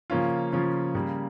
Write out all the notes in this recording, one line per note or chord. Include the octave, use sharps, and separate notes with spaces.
C#3 F3 A#3 C#4 F4
C#3 F3 A#3 C#4 F4
C#3 G3 A#3